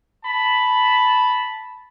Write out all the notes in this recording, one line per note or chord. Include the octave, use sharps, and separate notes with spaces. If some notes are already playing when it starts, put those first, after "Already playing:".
A5 B5